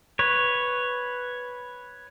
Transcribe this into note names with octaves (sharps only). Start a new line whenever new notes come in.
B4 C#5